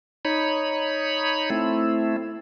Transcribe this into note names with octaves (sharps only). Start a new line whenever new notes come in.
D#4 C#5 B5
A3 C4 E4